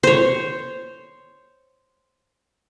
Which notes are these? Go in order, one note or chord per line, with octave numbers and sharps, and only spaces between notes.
C5 C#5